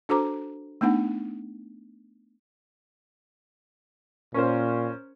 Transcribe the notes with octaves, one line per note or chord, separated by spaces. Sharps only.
D4 F#4 A4 C5 A#5 D6
A3 B3 D4 D#4 F#5
A#2 C#4 A#4 C5